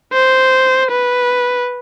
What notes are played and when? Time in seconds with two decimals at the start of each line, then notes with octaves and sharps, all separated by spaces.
0.13 C5
0.91 B4